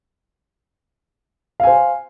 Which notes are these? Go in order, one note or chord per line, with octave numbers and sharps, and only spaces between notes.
C5 F5 G#5